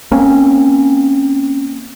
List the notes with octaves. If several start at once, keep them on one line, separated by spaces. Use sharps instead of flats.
A#3 C4 C#4